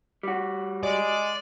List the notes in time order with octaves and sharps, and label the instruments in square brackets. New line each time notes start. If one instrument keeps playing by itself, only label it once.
[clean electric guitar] G3 F#4
[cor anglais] G#3 [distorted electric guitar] D5